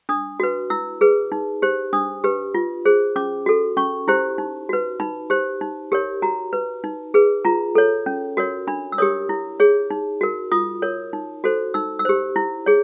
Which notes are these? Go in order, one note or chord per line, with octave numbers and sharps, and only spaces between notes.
D4 D#6
F#4 B4
E4 E6
G#4 B4
D#4
G4 C5
D4 D#6
G4 B4
F4
G#4 C5
C#4 D6
F#4 A4
C#4 C#6
E4 G4 C5
D#4
F#4 B4
D#4 B5
G4 C5
D#4
G4 A#4 C#5
F#4 A#5
B4
D#4
G#4 B4
F4 A#5
A4 C#5
C#4
F#4 A#4 C#5
D4 B5
E6
G4 A#4 C#5 D#6
E4
G#4 C#5
D#4
F#4 A#4
F4 D#6
A#4 C#5
D#4
F#4 A4 C5
D#4 E6
E6
G4 C5
E4
G#4 C#5